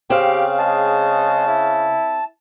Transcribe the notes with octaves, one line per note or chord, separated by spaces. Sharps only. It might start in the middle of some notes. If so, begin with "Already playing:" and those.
C#3 C4 G4 F5
G#3 A5
E4